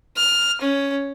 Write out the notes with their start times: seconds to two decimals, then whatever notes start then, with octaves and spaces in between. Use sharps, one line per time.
0.17 F6
0.61 C#4